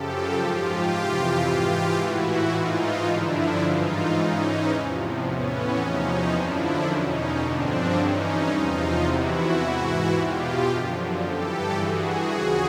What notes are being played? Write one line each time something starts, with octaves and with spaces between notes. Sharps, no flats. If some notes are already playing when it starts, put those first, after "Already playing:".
Already playing: F#2 C#3 F3 G4 A4
G#2 F3 F4 G4
F2 C3 E3 F4 G4
G#2 E3 F4 G4
A2 E3 E4 F#4
G#2 E3 D#4 F4
G2 D3 F3 D4 E4
G#2 E3 D#4 F4
G#2 E3 C#4 D#4
E2 C3 F3
A2 E3 B3 C#4
E2 C3 F3 C#4 D#4
F#2 D3 F3 D4 E4
E2 B2 C#4 D#4
G2 D3 F3 C4 D4
G2 E3 C#4 D#4
E2 C3 F3 D#4 F4
E2 C3 E3 E4 F#4
G#2 E3 E4 F#4
E2 B2 F4 G4
F#2 D3 F3
G2 E3 G4 A4
G2 E3 F#4 G#4
D#2 C#3 F3 F#4 G#4